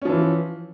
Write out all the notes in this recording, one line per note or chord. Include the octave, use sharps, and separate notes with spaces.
E3 F3 C#4